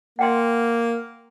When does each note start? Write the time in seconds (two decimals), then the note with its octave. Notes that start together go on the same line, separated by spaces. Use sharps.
0.19 A#3 F#5 G5 C6